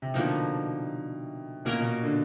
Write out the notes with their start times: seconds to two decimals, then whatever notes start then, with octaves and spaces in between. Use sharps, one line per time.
0.02 C3
0.14 B2 D3 F3 A#3 D#4
1.65 B2 A#3 C#4 F#4 A#4
1.73 A#2
1.81 B2
2.03 D3